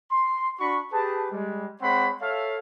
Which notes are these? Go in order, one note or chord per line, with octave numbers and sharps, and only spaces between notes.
C6
D4 F#4 B5 C#6
G4 G#4 B4 A5
G3 G#3
G#3 C4 C#5 F#5 B5 C6
A4 C#5 E5 F5